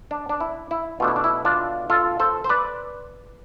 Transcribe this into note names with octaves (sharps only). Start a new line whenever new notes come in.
D4
D4
E4
E4
B2 A3 D4 F4
E4
D4
E4
D4 F4
F4 A4
A4 C5
C5
B4 D5